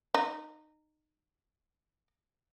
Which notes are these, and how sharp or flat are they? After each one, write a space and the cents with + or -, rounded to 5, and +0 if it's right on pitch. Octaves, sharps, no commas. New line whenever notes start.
D#4 -20